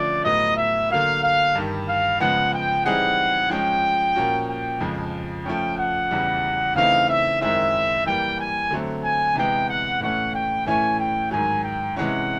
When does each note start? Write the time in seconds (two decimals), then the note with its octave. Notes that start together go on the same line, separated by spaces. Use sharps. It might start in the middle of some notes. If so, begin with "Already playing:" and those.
Already playing: D3 F3 A3 C#4 F4 D5
0.24 A2 F#3 B3 D#5
0.57 E5
0.90 D3 F#3 A#3 F5
1.22 F5
1.55 G2 D#3 G3
1.88 F5
2.20 C#3 F3 G#3 B3 F#5
2.53 G5
2.85 E3 G3 C4 D#4 G#4 F#5
3.50 F3 G#3 C#4 G5
4.16 A#2 F3 A#3 C#4 F#4
4.48 G5
4.80 F2 C#3 F3 G#3
5.46 F3 A3 C#4 G5
5.78 F#5
6.11 E2 C#3 E3 G3
6.75 C#3 E3 A3 C4 D#4 F5
7.09 E5
7.41 F#2 D#3 G#3 C4 E4 E5
8.06 E3 G3 A#3 G5
8.39 G#5
8.71 D3 F#3 A3 C4
9.03 G#5
9.36 C3 E3 G#3 B3 G5
9.69 F#5
10.01 A2 E3 A3 C#4 F#5
10.34 G5
10.66 A2 E3 A3 C#4 E4 G#5
10.99 G5
11.31 G#2 D#3 F#3 G#5
11.64 G5
11.96 C3 E3 G#3 C#4 E4 F#5